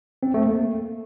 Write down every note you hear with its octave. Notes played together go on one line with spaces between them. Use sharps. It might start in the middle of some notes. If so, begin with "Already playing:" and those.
C4
A3
A#3